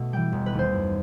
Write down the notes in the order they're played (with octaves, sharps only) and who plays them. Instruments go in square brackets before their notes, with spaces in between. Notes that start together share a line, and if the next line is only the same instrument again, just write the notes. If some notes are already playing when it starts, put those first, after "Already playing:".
Already playing: [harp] B2 A3
E3 G3 G5
E1
B4
D#2 D#3 A3
C5
F#2